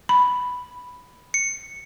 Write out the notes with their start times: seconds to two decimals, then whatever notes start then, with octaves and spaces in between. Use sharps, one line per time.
0.09 B5
1.34 C#7